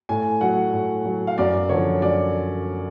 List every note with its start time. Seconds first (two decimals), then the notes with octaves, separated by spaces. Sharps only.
0.09 A2 G#5
0.41 F#3 F#5
0.73 A2
1.05 F#3
1.27 F5
1.38 F#2 D5
1.69 D3 F3 C#5
2.02 F#2 D5